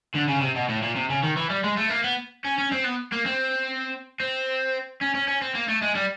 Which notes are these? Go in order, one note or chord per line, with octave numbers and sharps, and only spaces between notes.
D3
C#3
C3
B2
A2
A#2
C3
C#3
D#3
E3
G3
G#3
A3
A#3
B3
C#4
C#4
C4
B3
A#3
C4
C4
C#4
C#4
C#4
C4
A#3
A3
G#3
G3